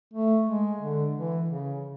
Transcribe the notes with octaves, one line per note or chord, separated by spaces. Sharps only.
A3
G#3
D3
E3
C#3